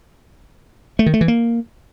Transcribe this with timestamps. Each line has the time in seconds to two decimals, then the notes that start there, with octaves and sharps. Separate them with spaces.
0.99 A3
1.06 D#3
1.14 A3
1.21 E3
1.28 A#3